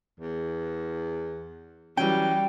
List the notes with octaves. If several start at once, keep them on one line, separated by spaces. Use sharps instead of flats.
E2
E3 F#3 G3 C#4 G5